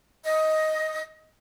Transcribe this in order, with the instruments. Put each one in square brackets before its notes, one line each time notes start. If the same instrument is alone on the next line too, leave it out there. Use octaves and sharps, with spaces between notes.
[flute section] D#5